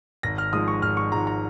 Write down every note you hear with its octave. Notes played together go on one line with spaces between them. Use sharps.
G#1 A#6
F6
G#2 F3 G#3 D#6
C#6
G#1 F6
C#6
G#2 F3 G#3 A#5
A#5